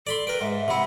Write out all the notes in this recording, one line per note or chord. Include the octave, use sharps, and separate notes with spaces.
A4 D5 B5 C6
A#4 B4 G5
G#2 E5
C3 E4 E5 F#5 B5